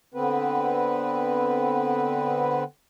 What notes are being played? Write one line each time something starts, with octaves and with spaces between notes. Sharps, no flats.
D3 B3 C4 B4